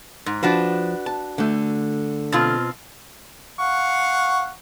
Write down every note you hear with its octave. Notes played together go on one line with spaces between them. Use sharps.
G#2
F3 D4 F#4 B4
A5
D3 A3
B2 C4 F4
F5 F#5 C#6